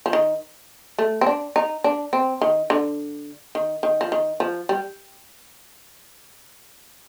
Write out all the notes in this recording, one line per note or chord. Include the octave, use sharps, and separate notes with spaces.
F3
D#3
A3
C4
D4
D#4
D4
C4
D#3
D3
D#3
D#3
F3
D#3
F3
G3